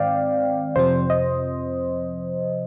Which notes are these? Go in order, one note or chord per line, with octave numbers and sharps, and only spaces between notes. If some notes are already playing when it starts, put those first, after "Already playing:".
Already playing: G#2 D#3 C4 D5 F5 G5
F2 C3 F3 C4 C5
D#5